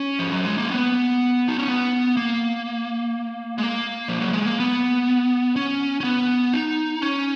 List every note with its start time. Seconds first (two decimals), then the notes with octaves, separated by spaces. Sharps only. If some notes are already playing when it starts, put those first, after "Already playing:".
Already playing: C#4
0.19 F3
0.32 F#3
0.45 G#3
0.58 A#3
0.71 B3
1.48 D#4
1.58 C#4
1.68 B3
2.17 A#3
3.58 G#3
3.63 A#3
4.08 F3
4.21 F#3
4.33 G#3
4.46 A#3
4.60 B3
5.56 C#4
6.00 C#4
6.04 B3
6.53 D#4
7.02 C#4